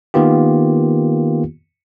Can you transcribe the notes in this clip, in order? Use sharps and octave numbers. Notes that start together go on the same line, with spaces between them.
D#3 A#3 B3 F4 G4